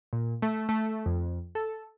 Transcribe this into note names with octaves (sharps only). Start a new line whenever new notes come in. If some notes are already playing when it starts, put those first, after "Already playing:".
A#2
A3
A3
F2
A4